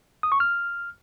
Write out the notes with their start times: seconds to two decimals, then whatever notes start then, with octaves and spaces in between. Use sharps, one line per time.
0.23 D#6
0.32 C#6
0.40 F6